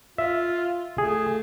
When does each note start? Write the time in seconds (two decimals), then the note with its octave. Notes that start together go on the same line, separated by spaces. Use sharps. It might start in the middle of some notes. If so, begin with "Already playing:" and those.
0.18 F4 E5
0.98 A3 G#4